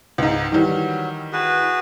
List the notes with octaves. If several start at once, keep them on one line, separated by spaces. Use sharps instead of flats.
C#2 G#2
D#3 E3 F#3 G3
F#4 G#4 B4